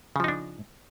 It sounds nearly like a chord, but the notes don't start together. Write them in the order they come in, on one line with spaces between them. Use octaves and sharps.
C#3 F3 D#4 D4